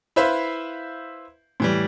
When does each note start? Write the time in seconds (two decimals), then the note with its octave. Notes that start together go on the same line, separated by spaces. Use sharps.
0.16 E4 B4 C5 E5 F5
1.60 A2 E3 G3